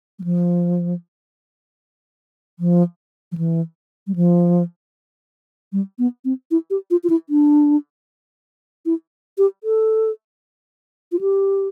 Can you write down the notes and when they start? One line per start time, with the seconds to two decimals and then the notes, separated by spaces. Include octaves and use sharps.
0.19 G3
0.24 F3
2.59 F3
3.32 F3
3.37 E3
4.07 G3
4.16 F3
5.72 G3
5.99 B3
6.25 C4
6.51 E4
6.70 G4
6.91 F4
7.04 F4
7.10 E4
7.29 D4
8.86 E4
9.38 G4
9.64 A4
11.12 F4
11.21 G4